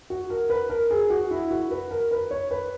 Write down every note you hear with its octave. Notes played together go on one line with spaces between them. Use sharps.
F#4
A#4
B4
A#4
G#4
F#4
E4
F#4
B4
A#4
B4
C#5
B4